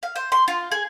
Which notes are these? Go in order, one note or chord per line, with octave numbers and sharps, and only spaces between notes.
F5
C5
C6
F4
G#4